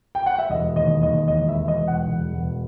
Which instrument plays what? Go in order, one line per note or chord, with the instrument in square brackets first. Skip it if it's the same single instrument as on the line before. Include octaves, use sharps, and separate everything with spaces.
[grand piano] G5
F#5
E5
E1 D#5
D#2 D#5
D#2 D#5
E1 D#5
E5
E1
D#5
E1
F#5
E1
E1